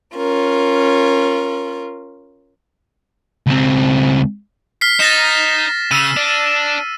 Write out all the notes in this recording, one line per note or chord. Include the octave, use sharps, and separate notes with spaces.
C#4 F4 A#4
C#2 C4
F6 B6 C7
D#4 A6 A#6 E7
C#3 E6 D#7
D4